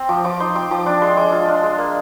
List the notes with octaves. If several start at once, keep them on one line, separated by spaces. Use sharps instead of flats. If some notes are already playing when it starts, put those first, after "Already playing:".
Already playing: C4
F3 D6
F3 D6
D#4 C6
C4 D6
F3 D6
D4 D6
G#3 C6
G#3 D6
F4
D4
G#3
A#3